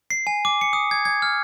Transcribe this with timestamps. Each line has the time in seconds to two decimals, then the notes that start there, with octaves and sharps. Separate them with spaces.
0.10 C7
0.27 G#5
0.45 D6
0.61 C#7
0.73 D#6
0.91 G#6
1.05 G#6
1.22 F6